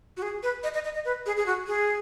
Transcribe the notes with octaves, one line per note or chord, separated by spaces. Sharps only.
F#4
G#4
B4
D#5
D#5
D#5
D#5
B4
G#4
G#4
F#4
G#4